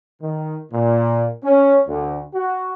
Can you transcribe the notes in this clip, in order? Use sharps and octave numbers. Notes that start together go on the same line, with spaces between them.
D#3
A#2
C#4
D2
F#4